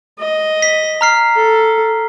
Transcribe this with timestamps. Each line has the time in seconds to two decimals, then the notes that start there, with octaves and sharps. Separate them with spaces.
0.19 D#5
0.62 B6
1.01 A#5 F6 C7
1.36 A4